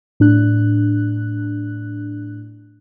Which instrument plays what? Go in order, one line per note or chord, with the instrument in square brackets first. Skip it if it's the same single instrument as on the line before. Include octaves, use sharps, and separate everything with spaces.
[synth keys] A2 D4 F#6